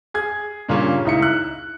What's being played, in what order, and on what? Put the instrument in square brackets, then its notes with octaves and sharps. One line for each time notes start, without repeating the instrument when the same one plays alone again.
[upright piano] G#4 G#6
G2 A#2 C#3 C#4
C#2 D#4 E4 C#7
F#6